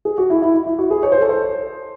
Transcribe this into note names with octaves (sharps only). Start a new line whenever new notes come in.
G#4
F#4
E4
E4
E4
E4
F#4
G#4
C#5
C5
A4
C5